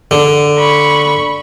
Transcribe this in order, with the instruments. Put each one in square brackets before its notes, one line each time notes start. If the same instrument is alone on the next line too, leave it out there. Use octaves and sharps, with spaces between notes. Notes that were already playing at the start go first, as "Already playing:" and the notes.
[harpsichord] D3
[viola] B5 C#6